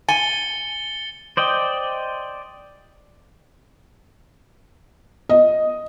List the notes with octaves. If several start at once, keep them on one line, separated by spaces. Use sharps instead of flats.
G#5 A6 C#7 G7
C5 D5 D#5 G5
D#5